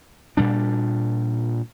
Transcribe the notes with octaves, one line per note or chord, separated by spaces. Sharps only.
A#2 G3 D4